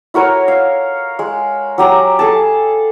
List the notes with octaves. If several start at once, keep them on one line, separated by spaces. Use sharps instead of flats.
E4 F#4 A#4 C#5
F5
G#3
F#3 G4 A#5
G#4 A4 A5